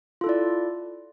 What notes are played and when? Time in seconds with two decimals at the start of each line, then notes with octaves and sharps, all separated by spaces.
0.21 F4
0.24 A4
0.26 E4
0.29 D5